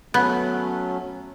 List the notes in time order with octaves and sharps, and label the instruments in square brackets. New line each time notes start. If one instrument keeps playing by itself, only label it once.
[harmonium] F#3 A3 C#4 [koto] B3